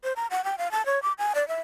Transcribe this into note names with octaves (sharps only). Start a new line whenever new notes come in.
C5
A#5
F#5
G5
F5
A5
C#5
D6
G#5
D5
E5